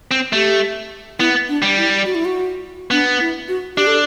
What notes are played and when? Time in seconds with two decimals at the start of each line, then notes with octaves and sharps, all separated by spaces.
0.11 C4
0.33 A3 G4
1.19 B3 E4
1.48 D4
1.62 G3
1.77 E4
2.05 F#4
2.15 E4
2.25 F#4
2.91 B3 D4
3.20 E4
3.48 F#4
3.77 D4 G4
3.87 A4